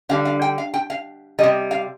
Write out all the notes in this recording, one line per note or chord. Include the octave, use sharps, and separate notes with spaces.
D3 G3 F5
F5
G5
F5
G5
F5
C3 G3 D#5
F5